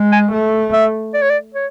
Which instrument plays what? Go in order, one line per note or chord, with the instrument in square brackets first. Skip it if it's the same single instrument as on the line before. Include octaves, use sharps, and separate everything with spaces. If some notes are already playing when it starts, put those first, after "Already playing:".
Already playing: [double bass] G#3
[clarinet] G#5
[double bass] A3
[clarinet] E5
D5
C#5
D5
C#5